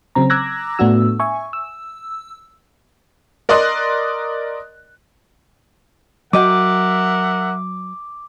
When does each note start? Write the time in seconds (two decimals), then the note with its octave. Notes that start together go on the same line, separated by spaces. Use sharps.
0.15 C#3 F#3 C4 A#5
0.30 A#5 D6 E6 F#6 G#6 A#6
0.79 A2 A3 B3 D4 F#4 E6
1.20 E5 G#5 C#6
1.53 E6
3.49 A#4 D5 D#5 C6 D#6 F#6
6.33 F#3 A#4 D#5 E5 F#5 G5 D6